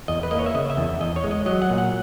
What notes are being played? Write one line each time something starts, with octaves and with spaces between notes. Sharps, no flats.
E2 D#5
B4
A#3 D#5
C#5
E5
C#3 D#5
E5
E2
E5
E2 D#5
C#5
G#3
D#5
F#3 D#5
F#5
A#2
F#5